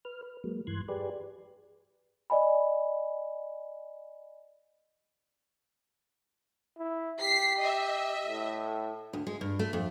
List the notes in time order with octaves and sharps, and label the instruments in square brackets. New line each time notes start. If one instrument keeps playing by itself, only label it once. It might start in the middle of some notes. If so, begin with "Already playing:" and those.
[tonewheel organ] B4 F6
B4
F#3 G#3 A#3
G2 E3 C6 F#6 G#6
G4 G#4 B4 D5
[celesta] D5 D#5 G#5 B5
[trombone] E4
[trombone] G4 [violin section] B6 C7
[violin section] D#5 E5
[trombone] A2
[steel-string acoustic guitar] D2
G#3
G2
A3
F2